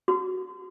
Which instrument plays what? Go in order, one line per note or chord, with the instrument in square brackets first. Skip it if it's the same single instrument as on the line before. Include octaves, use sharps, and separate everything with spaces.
[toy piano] F#4